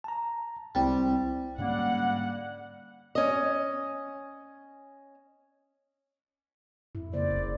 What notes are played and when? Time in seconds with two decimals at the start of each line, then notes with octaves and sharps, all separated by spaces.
0.04 A5 A#5
0.75 C2 G3 C4 E4
1.58 G#2 D3 G3 A#3 C#4 F#5
3.15 C#4 D#5
6.95 F2 E4
7.13 C#3 A#3 C5 D5
7.31 F1